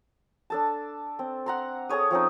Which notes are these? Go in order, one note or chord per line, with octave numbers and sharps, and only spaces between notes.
D4 A4 A5
C4
F#5 A#5 C6
G#4 A4 C#5 D#6
F3 C4 C#4 D#4